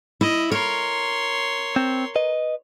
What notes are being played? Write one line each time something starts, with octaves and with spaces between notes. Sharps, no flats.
E4 D#5
A#4 C#5 C6
C4
B4 D#5